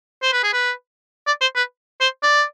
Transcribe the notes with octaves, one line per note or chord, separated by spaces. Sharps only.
C5
B4
G#4
B4
D5
C5
B4
C5
D5